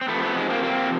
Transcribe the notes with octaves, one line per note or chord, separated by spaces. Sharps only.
C4
C3 F3 A3 B3
A3 B3
G#3
A#3 C4
A#3 C4